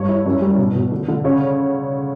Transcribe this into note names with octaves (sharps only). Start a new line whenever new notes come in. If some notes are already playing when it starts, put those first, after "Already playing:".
Already playing: G2 C#5
E4
F#2
G3
B2
B2
D3
D3
C#3 C#5